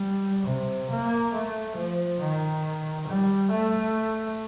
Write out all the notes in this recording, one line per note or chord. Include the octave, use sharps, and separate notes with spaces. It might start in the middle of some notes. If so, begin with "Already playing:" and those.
Already playing: G3
C3
A#3
A3
F3
D#3
G3
A3